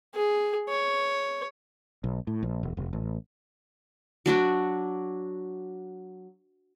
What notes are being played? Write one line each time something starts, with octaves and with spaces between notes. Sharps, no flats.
G#4
C#5
B1
A2
A#1
E1
F1
A1
F#3 D4 F#4